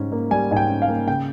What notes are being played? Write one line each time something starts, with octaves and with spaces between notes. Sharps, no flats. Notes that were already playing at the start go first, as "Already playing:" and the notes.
Already playing: G#2 G3 C#4
A#3
G3 G#5
G#2 G#5
G5
C#4
F5
A#3
C#3 G5